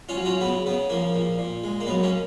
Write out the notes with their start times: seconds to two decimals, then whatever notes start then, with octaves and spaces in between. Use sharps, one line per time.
0.09 C#4 F4
0.17 F#3
0.25 C#4 F4
0.41 C#3 B3
0.66 C#3 B3
0.90 F3 A#3
1.15 A#2
1.38 A#2
1.64 G#3
1.80 A#3
1.87 F#3 B3
2.03 A#3 C#4